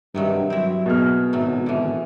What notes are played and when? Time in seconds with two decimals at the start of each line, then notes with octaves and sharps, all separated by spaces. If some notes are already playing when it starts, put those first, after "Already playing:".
0.15 G2 C3 D#3 F#3
0.50 F#3 C4 E4
0.86 B2 G#4 F6
1.33 G#1 A2 F#3
1.66 D3 E3